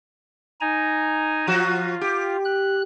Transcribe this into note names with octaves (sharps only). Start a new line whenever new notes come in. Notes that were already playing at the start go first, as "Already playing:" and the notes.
D#4 G#5 A#5
F3 F4 F#4
G4
F#6